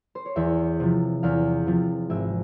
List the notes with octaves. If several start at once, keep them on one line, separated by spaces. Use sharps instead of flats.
C5
C#5
E2 E5
C3 F3
E2 F5
C3 F3
G#1 E5